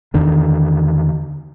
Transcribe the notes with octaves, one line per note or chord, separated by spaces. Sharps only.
E2 D3 D#3